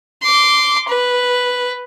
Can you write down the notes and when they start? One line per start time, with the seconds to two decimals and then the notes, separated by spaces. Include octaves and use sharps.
0.22 C6 D6
0.88 B4